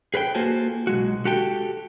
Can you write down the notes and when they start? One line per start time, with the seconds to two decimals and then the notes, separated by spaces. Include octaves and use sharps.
0.14 G#4 B4 C#5 G5
0.35 A#3 F4 F#4 A4 C5 G#5
0.87 B1 G#3 F#4
1.25 F#4 G4 A4 G5